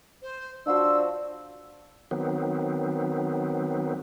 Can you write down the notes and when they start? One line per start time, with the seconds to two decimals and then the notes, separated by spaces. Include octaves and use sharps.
0.22 C5
0.67 F3 D4 F#4 C5 E6
2.11 D#3 F#3 B3 C4